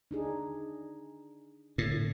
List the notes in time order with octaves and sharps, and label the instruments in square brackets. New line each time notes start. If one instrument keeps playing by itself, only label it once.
[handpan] D4 D#4 G#4
[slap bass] A2 [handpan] D3